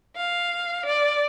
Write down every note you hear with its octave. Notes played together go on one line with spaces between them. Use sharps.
F5
D5